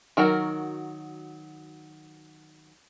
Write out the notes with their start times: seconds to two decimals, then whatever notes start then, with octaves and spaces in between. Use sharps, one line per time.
0.17 D#3 F#3 F#4 A#4